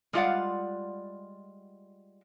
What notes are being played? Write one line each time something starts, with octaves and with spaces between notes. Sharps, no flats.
G3 G#3 F4 D5 F5 F#5